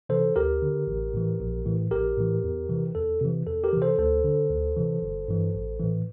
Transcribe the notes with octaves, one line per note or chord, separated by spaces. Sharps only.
C3 E3 A4 C5
D2 G4 A#4
D3
A1
A2 E3
A#1
A2 E3
A#1 G4 A#4
A2 E3
E2
C3 E3
E2 A4
C3 E3
E2 A4
G4 A#4
C3 E3
A4 C5
D2 A4 C5
D3
D2
C3 E3
G1
G2 E3
A1
A2 E3